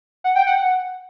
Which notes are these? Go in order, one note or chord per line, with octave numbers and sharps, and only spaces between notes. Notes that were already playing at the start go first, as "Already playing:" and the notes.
F#5
G5
F#5